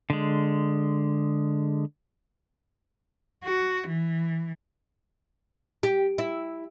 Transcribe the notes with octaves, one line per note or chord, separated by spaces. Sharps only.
D3 G#3
F#4
E3
G4
E4